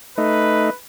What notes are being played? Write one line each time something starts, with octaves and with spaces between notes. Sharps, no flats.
A3 D#4 B4